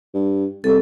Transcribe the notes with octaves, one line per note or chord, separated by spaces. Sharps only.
G2
C2 A4